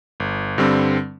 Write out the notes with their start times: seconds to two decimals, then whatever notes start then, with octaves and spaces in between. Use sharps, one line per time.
0.20 G1
0.58 G2 D3 G3 C4